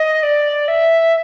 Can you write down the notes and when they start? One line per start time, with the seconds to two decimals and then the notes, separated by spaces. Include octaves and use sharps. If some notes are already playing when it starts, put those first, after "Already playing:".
Already playing: D#5
0.23 D5
0.68 E5